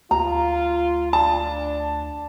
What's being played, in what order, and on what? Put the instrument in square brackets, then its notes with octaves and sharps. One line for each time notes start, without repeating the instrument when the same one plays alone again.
[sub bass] D2 [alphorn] F4 [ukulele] A#5
[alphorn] D4 [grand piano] A5